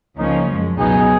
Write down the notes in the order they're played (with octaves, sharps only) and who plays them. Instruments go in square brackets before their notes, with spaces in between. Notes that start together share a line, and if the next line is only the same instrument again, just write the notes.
[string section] C#2 C#3 F3 A#3 C#4 [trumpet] D#4
[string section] F#2 F3 G#3
[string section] C#2 B2 F#3 B3 D#4 [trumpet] G#4